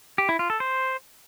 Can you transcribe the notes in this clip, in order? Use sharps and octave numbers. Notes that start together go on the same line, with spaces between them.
G4
E4
F4
A4
C5